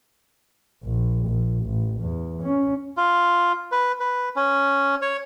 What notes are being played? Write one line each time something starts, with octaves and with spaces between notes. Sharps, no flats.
A#1
A#1
A1
E2
C#4
F4
B4
B4
C#4
C#5